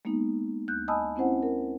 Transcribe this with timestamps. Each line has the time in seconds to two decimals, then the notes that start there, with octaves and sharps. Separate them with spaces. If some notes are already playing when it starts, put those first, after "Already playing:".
0.05 G#3 A#3 B3 D#4
0.68 D2 F#6 G6
0.88 D#5 G#5 A5 B5 D#6 E6
1.16 C4 C#4 E4 C5 F#5
1.43 A#4